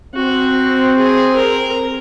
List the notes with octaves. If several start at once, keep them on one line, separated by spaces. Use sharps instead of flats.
C4 F#4
G#4
A#4